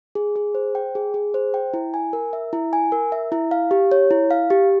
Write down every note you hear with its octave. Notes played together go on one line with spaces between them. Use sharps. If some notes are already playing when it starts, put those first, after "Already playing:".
G#4
G#4
C5
G5
G#4
G#4
C5
G5
E4
G#5
A#4
E5
E4
G#5
A#4
E5
E4
F5
G4
C#5
E4
F5
G4